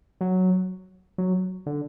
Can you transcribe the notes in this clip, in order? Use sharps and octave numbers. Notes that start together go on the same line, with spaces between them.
F#3
F#3
D3